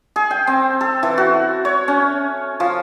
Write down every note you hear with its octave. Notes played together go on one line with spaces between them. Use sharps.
G#4
G5
C4
A4
E3
F#4
C#5
C#4
F3